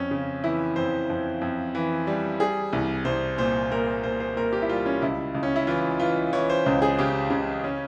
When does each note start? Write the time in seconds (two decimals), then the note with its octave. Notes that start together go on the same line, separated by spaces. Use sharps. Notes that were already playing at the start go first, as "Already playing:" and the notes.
Already playing: F2 C#4
0.11 C#3
0.44 E3 E4
0.76 F2 C5
1.10 F2
1.41 F2
1.75 E3
2.07 G3
2.40 G3 G#4
2.73 C2
3.05 C2 C5
3.38 A#2 C5
3.71 A#2 A#4
3.87 C5
4.03 A#2 C5
4.20 C5
4.36 A#2 A#4
4.53 G4
4.62 E4
4.69 G3 F4
4.86 C#4
5.02 C#2 E4
5.35 C#2
5.43 C#4
5.56 E4
5.67 E3 F4
6.00 E3 F4
6.33 E3 C#5
6.50 C5
6.66 C#2
6.82 G#4
6.98 C#3 G4
7.30 C#3
7.64 C#4